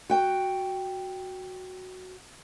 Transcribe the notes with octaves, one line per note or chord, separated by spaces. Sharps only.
F#4 G5